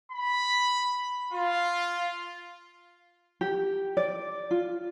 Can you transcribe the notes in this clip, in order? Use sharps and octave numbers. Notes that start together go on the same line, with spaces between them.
B5
F4
G4
D5
F4